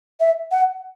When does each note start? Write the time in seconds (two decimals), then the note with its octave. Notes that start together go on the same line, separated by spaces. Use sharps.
0.20 E5
0.52 F#5